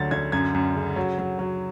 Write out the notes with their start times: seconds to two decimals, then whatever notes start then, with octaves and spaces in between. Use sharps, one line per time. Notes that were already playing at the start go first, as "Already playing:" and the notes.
Already playing: D2 F#3 A6
0.11 D2 G#6
0.32 F#2 G#6
0.54 F#2
0.75 C#3
0.96 F#3
1.18 F#3
1.39 F#3